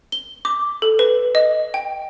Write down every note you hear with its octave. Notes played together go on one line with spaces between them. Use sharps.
G7
D6
A4
B4
D#5
G5